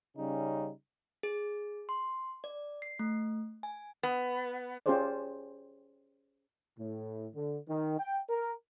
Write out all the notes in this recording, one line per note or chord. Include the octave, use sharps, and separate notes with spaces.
C#3 G3 C#4 D#4
G#4
C6
D5
C7
A3
G#5
B3
C#4 F4 G4 G#4 C5 D5
A2
D3
D#3
G5
A#4